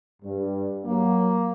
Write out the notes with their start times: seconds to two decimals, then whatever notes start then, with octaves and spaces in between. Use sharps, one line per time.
0.22 G2
0.84 F#3 A#3